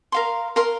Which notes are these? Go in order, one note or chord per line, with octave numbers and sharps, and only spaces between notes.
A#4 F5 C6
A#4 F5 C6